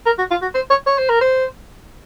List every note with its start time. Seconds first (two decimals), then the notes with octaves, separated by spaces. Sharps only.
0.06 A#4
0.18 F#4
0.31 F4
0.42 F#4
0.55 C5
0.70 C#5
0.87 C#5
0.98 C5
1.09 A#4
1.21 C5